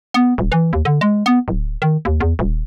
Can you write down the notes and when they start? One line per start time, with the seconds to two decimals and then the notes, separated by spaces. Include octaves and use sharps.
0.14 B3
0.38 D#1
0.52 E3
0.73 D#2
0.85 D3
1.01 G#3
1.26 B3
1.48 D1
1.82 D#3
2.05 D#2
2.20 E2
2.39 D#1